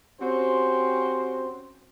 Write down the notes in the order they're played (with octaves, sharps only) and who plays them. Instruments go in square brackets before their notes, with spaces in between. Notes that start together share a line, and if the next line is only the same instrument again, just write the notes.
[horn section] C4 C#4 F#4 G4 C5